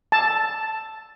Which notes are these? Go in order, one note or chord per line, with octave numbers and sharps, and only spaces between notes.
A5